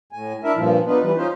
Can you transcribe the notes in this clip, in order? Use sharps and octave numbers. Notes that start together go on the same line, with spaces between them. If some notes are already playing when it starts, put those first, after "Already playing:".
A2 G#5
D4 E4 A#4 E5
G2 A#2 F3
B3 D4 D#4 F4 B4
E3 G3 B4
C#4 D#4 F4 C5